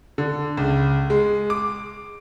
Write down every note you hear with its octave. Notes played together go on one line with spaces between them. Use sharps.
D3
C#2
G#3
D6